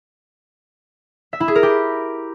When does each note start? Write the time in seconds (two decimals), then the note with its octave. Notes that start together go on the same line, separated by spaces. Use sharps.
1.33 E5
1.40 E4
1.48 G#4
1.55 A#4
1.63 G4